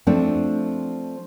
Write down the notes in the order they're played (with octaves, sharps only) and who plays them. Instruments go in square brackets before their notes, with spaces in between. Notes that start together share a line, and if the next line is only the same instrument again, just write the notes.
[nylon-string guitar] F3 A3 C4 D4